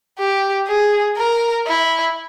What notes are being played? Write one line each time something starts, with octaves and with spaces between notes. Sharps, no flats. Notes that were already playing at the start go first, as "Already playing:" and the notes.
G4
G#4
A#4
E4